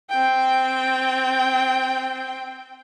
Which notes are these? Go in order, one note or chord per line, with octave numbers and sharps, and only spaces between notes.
C4 G5